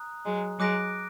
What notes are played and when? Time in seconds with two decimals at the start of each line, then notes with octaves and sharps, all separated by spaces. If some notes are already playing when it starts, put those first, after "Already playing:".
Already playing: A#5 D#6 F#6
0.25 F#3 G#3
0.59 F#3 G#3 D6 F#6 A#6 D7